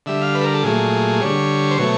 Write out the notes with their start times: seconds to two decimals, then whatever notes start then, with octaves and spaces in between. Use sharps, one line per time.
0.06 D3 G3 E5
0.21 F5
0.35 B4
0.41 A4
0.44 A#4
0.54 A4
0.64 A#2 F#3 A3 G#4
1.21 D3 G3 C#5
1.71 C5
1.78 B2 F#3 A3 C#5